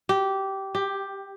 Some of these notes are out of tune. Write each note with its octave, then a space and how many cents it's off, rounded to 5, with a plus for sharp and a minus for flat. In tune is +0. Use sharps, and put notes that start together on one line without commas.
G4 -15
G4 +10